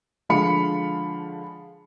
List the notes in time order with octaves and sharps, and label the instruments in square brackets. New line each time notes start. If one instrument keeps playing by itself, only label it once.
[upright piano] D3 F3 G#3 F5 B5 C#7